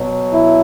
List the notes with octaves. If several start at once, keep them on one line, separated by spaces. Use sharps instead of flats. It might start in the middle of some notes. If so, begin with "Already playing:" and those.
Already playing: B2 F#3
E4